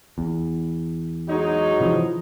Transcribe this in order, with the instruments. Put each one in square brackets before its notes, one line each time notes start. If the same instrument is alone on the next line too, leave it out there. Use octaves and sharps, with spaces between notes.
[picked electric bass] E2
[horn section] F#3 G#3 D#4
[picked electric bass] C3 E3 F3